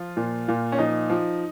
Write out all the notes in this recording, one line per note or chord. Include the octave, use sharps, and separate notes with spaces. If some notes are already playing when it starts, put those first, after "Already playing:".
Already playing: F3 F4
A#2
A#2
C#4
F3 D#4
F3